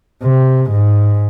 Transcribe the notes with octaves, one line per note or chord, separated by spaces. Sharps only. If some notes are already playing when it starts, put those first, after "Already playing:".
C3
G#2